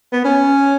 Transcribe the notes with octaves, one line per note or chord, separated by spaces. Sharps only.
B3
C#4